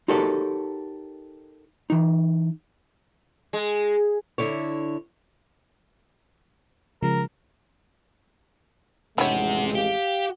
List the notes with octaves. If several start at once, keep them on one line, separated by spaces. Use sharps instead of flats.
D#4 F#4 G4 A4 A#4 C#5
E3 D#4
G#3
D3 E4 C#5
C#3 F3 G#3 A#4
A1 F2 C3 G#3 D4 E4 C#5 F#5
G4 F5